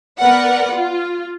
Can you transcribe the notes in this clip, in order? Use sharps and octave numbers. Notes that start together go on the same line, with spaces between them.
B3 A#4 B4 D5 F#5
F4